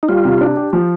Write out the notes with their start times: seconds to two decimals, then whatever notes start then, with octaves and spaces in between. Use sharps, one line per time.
0.03 D#4
0.08 G3 F4
0.25 C3
0.41 D4
0.57 G4
0.73 F3